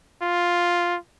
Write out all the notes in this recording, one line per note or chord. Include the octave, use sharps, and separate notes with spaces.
F4